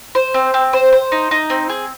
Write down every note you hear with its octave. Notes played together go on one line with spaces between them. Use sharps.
C5
C4
C4
C5
C5
D#4
D#4
C4
G#4